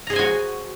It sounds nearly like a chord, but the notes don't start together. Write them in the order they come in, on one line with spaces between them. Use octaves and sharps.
A#5 G#4 C5 G#5 F#4